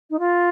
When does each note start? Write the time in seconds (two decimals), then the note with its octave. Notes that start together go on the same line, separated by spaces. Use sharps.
0.10 D#4
0.19 F4